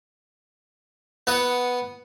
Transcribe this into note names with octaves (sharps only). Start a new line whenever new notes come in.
B3 F#5 D#6